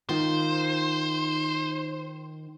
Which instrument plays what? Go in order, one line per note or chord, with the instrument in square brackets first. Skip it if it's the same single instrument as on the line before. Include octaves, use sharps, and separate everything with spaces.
[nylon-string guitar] D#3 F4 [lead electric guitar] C5